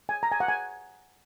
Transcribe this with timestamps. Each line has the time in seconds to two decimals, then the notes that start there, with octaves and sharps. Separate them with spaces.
0.09 G#5
0.23 A#5
0.32 G#5
0.40 F#5
0.48 G#5